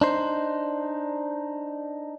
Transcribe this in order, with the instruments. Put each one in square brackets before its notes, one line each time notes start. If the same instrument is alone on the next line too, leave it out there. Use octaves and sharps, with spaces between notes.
[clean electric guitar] D4 D#4 C5